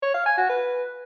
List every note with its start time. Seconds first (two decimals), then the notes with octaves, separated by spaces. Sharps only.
0.02 C#5
0.14 F5
0.26 G#5
0.38 F#4
0.49 B4